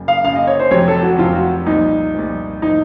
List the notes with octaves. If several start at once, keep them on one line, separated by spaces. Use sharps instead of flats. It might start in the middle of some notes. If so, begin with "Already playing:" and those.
Already playing: F#1 F#2 C#3
F5
F#1 F#2 C#3 F5
D#5
C#5
C5
F1 F2 C3 F#3 C#5
A4
F#4
F1 F2 C3 F#3 F4
F#4
C2 A#2 F3 D#4
C2 A#2 F3
A2 F3 A#3 D#4